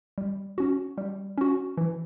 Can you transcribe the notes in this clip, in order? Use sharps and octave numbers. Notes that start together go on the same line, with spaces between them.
G3
C#4 F#4
G3
C#4 F#4
E3